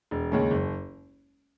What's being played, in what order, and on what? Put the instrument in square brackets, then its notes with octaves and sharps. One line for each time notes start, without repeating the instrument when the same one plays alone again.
[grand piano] E1
D#2 C#3 G#3 C#4
F#1